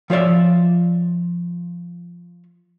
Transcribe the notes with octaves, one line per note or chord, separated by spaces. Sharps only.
F3 F4 C#5 D5 E5